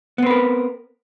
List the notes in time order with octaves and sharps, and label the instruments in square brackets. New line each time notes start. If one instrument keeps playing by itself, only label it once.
[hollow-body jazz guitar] B3
C4
B4
A#4